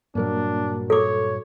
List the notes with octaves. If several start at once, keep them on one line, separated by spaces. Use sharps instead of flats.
G2 A#2 F#3 A#3 D4 A#4
A4 C#5 D6